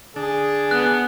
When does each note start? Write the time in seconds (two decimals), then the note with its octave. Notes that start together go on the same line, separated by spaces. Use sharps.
0.16 D3 D4 G#4 A5
0.71 B3 F#6